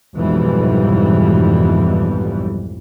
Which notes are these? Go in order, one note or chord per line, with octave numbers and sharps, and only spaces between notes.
B1 F2 G#2 B2 E3 G3